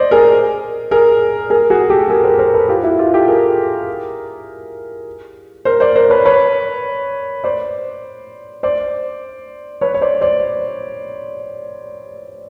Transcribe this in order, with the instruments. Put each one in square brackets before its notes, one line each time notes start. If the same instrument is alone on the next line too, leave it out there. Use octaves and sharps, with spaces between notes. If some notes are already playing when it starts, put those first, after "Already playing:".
Already playing: [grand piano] C5 D5 D#5
G#4 A#4
G#4 A#4
G#4 A#4
F#4 G#4
G4 A4
G#4 A#4
A#4 C5
A#4 C5
A4 B4
F4 G4
E4 F#4
F4 G4
G4 A4
G#4 A#4
A#4 C5
C5 D5
A#4 C5
B4 C#5
B4 C#5
C5 D5
C5 D5
B4 C#5
C#5
C5 D5
C5 D5